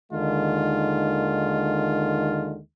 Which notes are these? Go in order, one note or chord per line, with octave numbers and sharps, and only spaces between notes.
D#2 D3 D#3 G#3 F4